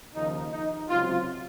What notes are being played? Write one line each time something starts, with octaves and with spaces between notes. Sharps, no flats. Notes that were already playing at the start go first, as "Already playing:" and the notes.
D#2 C#3 F3 D#4
D#4
C#2 C3 F#3 C4 F4